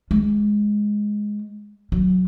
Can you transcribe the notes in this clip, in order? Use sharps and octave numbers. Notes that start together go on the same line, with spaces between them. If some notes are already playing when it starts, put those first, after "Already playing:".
G#3
F#3